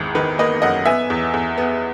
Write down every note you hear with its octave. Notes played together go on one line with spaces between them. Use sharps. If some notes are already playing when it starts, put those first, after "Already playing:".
Already playing: G#1 E2
D#3 B4
A#3 B4 D#5
F#2 D#5 F#5
B3 E5 G#5
E2
E2
B3